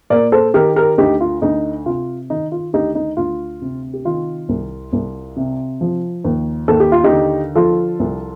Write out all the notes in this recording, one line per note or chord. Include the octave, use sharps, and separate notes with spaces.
A#2 A#4 D5
A4 C5
D#3 G4 A#4
G4 A#4
D2 D#4 G4
F4
D2 D#4
C3 F4
D#3 D#4
F4
D2 D#4 G4
D#4
D2 F4
C3
G4
D#3 F4
C2
C2
C3
F3
D#2
D#2 A4
G4
F4
D#4 G4
D3
F3 F4 A4
C2